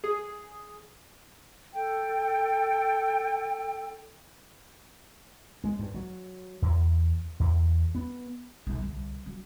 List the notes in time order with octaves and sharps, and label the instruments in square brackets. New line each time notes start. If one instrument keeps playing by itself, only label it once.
[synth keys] G#4
[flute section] A4 G5
[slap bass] G#3
G2
F#3
E2
E2
B3
[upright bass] B1
C2 D3
F#3